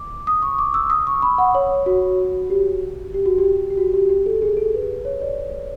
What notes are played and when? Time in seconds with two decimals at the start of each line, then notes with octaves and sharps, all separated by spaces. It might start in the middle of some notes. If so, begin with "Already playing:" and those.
Already playing: D6
0.27 D#6
0.42 C#6
0.58 D6
0.74 E6
0.90 D#6
1.07 C#6
1.22 B5
1.38 F#5
1.55 C#5
1.86 F#4
2.50 G4
3.14 G4
3.26 F#4
3.38 G4
3.70 G4
3.77 F#4
3.94 G4
4.10 G4
4.26 A4
4.42 G#4
4.57 A4
4.74 B4
5.05 C#5
5.22 D5